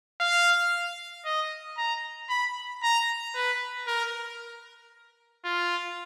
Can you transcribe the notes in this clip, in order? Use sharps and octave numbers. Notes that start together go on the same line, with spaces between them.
F5
D#5
A#5
B5
A#5
B4
A#4
F4